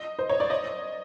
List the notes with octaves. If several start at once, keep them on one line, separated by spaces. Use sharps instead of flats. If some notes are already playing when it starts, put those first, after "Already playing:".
Already playing: D#5
C5
C#5
D5
D#5